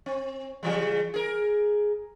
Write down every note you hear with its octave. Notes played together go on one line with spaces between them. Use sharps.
C4
C#3 E3 G3
G#4 A#4